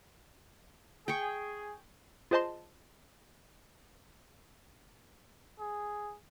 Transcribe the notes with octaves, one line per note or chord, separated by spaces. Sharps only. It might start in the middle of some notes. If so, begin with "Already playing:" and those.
G#4 G5 C#6
F4 G#4 C5 D#5 A5 C6
G#4